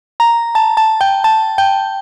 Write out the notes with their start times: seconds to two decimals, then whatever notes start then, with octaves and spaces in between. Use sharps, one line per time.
0.20 A#5
0.55 A5
0.77 A5
1.01 G5
1.24 A5
1.58 G5